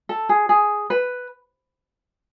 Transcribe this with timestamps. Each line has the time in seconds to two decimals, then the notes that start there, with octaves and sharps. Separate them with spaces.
0.09 A4
0.29 G#4
0.49 G#4
0.90 B4